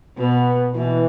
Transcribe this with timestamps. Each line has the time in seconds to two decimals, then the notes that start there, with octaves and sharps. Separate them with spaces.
0.18 B2 B3
0.75 B2 E3